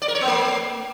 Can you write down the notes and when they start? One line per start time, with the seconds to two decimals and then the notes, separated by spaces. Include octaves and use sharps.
0.02 D5
0.08 A#4
0.15 C#5
0.21 B3
0.28 A3